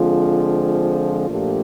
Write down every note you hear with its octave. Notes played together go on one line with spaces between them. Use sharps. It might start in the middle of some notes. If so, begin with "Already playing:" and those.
Already playing: D3 F3 G#3 C4 F4
A#2 F3 A3 D4 G4